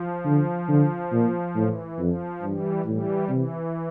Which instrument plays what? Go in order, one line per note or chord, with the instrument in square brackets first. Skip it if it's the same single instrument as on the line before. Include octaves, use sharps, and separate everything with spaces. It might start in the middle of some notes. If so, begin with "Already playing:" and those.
Already playing: [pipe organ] F3
[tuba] D3
D3
A#2
[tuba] A2 [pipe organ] E3
[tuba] F2 [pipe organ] F3
[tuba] G2 [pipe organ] E3 G3
[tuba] A2 [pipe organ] E3 G3
[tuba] C3 [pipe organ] E3